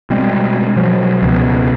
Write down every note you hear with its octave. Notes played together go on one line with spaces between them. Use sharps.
B2 G3 G#3 C4
B2 F3 F#3
C#2 B2